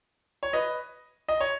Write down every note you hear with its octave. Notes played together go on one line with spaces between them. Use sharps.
C#5
B4 D#5
D#5
C#5